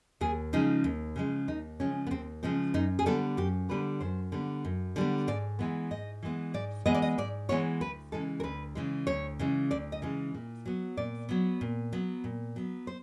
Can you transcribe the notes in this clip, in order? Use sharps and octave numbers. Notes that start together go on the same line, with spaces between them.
D#2 G#4
C#3 F3 G#3 D#4
D#2
C#3 F3 G#3
D#2 D#4
C#3 F3 G#3 C#4
B3
D#2 C4
C#3 F3 G#3 C4
F#2 D#4
G#4
D3 G3 B3 A4
F#2 G4
D3 G3 B3 B4
F#2 C5
D3 G3 B3
F#2
D3 G3 B3
G#2 D5
E3 G#3 B3
G#2 D#5
E3 G#3 B3
G#2 D5
E3 G#3 B3 D#5
D5
D#5
G#2 D5
E3 G#3 B3 C#5
D2 B4
C#3 E3 G#3 A4
A#4
D2 B4
C#3 E3 G#3
D2 C#5
C#3 E3 G#3
D2 D5
D#5
C#3 E3 G#3
A#2
F#3 B3
A#2 D5
F#3 B3
A#2
F#3 B3
A#2
F#3 B3
C5